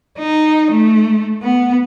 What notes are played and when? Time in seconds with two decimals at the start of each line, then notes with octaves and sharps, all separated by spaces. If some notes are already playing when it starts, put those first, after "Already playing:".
0.19 D#4
0.71 A3
1.43 B3